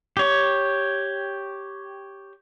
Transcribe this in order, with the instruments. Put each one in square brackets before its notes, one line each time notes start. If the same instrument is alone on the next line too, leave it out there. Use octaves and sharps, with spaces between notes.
[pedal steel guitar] G4 C#5